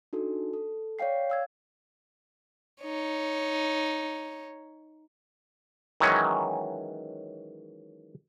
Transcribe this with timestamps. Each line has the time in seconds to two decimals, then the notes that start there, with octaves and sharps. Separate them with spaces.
0.13 D4 D#4 F#4 A4
0.53 A4
0.99 C#5 D5 F5 G5 C7
1.30 F5 E6 G#6
2.82 D#4 C#5
6.00 D#3 E3 F#3 G#3 C#4